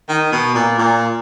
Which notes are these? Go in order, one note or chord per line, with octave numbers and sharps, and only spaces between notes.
D#3
B2
A#2
A#2